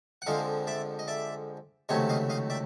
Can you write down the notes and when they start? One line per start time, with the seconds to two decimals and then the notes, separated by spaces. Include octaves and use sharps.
0.22 F#5
0.26 F2 D3 F3 G#3 D#5 F5
0.67 D5 E5
0.99 D#5
1.08 D5 E5
1.89 C#2 C3 D#3 F#3 A3 C#5 D#5
2.09 D#5 F5
2.30 D#5 F5
2.50 D5 E5